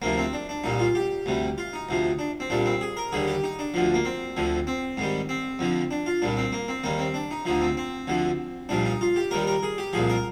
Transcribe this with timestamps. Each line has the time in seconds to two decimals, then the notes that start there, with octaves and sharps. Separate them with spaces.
0.02 D2 C3 F3 A#3
0.18 C4
0.33 D4
0.49 D4
0.64 C2 A#2 G3 D#4
0.79 F4
0.95 G4
1.26 D2 C3 G3
1.58 F4
1.73 D#4
1.89 D2 C3 F3
2.19 D4
2.40 C4
2.50 C2 A#2 G3 D4
2.66 C4
2.81 G#4
2.97 A#4
3.12 D#2 D3 G3 G#4
3.28 G4
3.44 D#4
3.59 D4
3.74 D2 D3 F3
3.94 A#3
4.05 C4
4.37 D2 D3 F3
4.67 C4
4.97 G#2 D#3 G3
5.29 C4
5.59 F2 D3 F3
5.91 D4
6.06 F4
6.22 C2 A#2 G3 D4
6.37 C4
6.52 A#3
6.68 C4
6.83 D#2 D#3 G3 A#3
6.99 C4
7.14 D4
7.31 D#4
7.45 D2 D3 F3 D#4
7.61 C4
7.77 C4
8.08 D2 D3 F3
8.69 C2 A#2 F3 D4
8.85 D#4
9.01 F4
9.16 G4
9.31 D#2 D#3 G3 A#4
9.47 A#4
9.63 G#4
9.78 G4
9.93 C2 A#2 F3 G#4
10.09 A#4